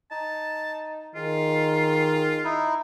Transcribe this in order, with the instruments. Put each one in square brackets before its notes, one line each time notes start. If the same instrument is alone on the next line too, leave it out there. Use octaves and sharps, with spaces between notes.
[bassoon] D#4 [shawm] A5
[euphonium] D#3 [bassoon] G#3 [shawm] F4
[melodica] D#4 E4